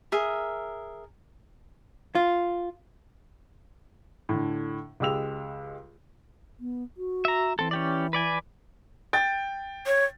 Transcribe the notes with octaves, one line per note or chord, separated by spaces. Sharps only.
G#4 A#4 E5
F4
A2 D3
C#2 G#3 G4 E6 F7
B3
F#4
E5 A#5
E3 C4 A4
C#4 G4 D5
B4 D5 G#5
G5 A6
C#5